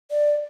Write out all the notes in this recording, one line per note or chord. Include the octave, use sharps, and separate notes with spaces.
D5